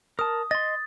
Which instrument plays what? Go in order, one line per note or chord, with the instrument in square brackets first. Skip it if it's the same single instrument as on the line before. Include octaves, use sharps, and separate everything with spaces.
[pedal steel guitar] A#4 A5 [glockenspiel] D#6
[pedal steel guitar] D#5 C6 [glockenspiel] A6